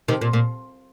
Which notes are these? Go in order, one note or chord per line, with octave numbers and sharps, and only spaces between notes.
C3 D#3
A#2
A#2